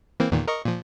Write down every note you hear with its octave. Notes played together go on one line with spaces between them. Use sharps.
E3 A#3 C4
E2 A#2 D#3
A#4 D#5 C#6
A#2 F3